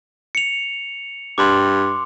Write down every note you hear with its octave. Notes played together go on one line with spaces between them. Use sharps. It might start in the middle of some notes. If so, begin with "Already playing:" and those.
C#7 F7
G2 C6 D6